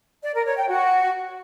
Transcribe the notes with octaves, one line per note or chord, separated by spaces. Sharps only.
D5
A#4
C#5
G5
F#4